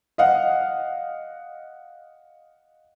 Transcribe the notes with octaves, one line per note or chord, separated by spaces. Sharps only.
D#5 F5 F#5